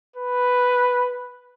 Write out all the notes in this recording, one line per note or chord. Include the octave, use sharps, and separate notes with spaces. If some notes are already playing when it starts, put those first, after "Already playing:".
B4